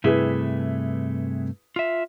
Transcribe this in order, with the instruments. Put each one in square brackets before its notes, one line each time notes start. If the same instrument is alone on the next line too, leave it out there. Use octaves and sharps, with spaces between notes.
[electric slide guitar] G2 C3 A3 [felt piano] E4 G#4 B4
[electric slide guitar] F4 E5